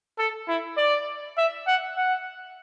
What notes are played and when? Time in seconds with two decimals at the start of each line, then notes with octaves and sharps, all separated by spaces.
0.19 A4
0.48 E4
0.77 D5
1.38 E5
1.67 F#5
1.97 F#5